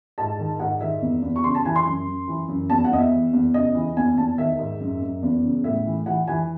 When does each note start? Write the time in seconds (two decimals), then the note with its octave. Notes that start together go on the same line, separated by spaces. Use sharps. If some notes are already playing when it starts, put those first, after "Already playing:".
0.18 G#2 A5
0.39 D#3
0.60 G#2 F#5
0.81 D#3 E5
1.02 E2
1.22 E2
1.36 C#6
1.44 C#3 C6
1.55 A5
1.65 E3 G#5
1.76 C6
1.86 F#2
2.07 F#2
2.28 E3
2.48 F#2
2.70 E2 A5
2.84 F#5
2.92 E2 D#5
2.98 E5
3.12 E3
3.33 E2
3.54 C#3 D#5
3.75 E3
3.97 E2 G#5
4.17 E2 A5
4.38 D#3 E5
4.59 G#2
4.80 F#2
5.02 F#2
5.23 E2
5.43 C#3
5.64 A2 E5
5.86 E3
6.06 E3 F#5
6.28 E3 G#5